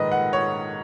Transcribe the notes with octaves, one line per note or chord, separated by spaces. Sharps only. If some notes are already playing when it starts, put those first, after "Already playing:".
Already playing: A#1 G#2 D#3 B4 D#5
F#5
C#5